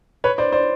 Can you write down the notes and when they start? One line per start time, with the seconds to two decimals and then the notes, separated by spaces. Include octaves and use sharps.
0.24 B4 C#5
0.38 C5 D5
0.52 C5 D5